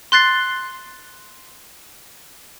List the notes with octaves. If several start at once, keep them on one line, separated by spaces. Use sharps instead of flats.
C6 F#6 A6 C7